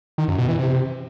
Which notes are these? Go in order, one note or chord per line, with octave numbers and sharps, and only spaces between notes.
D#3
F#2
B2
E3
C3